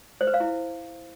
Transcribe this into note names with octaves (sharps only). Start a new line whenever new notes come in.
C5
B4
F5
E4